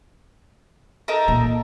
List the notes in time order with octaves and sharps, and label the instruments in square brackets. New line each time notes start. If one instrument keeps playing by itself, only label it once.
[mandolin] D#4 A4 A#4
[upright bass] A#2